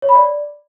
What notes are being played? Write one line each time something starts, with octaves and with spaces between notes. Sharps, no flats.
C#5
B5
D5